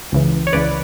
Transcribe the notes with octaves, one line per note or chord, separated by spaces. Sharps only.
C#2 C#3 E3
C#5
C#2 C#3 E3 B4 D5